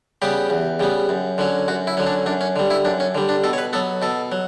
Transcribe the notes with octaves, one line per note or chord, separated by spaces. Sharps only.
C#3 G3 B3 G4
E2
C#3 G3 B3
F#2
D3 F#3 C#4
F#2 F#4
E4
D3 F#3 C#4
D4
F#2 D4
C#4
D3 G3
E4
F#2 D4
C#4
D3 G3
D4
B2 A4
C#5
B4
F#3 B3 A4
B2 A4
F#3